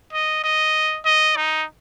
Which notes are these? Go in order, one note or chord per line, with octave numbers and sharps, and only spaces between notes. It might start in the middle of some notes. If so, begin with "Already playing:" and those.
D#5
D#5
D#5
D#4